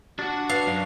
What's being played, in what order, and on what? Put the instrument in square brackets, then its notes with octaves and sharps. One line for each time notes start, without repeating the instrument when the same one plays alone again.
[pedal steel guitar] D4 [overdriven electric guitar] F#4 F#5
[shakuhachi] B4 [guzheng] F5
[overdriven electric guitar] F#2